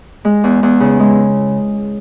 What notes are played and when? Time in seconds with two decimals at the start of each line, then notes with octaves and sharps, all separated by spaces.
0.25 G#3
0.44 E2
0.63 E2
0.80 C#3
1.00 G#3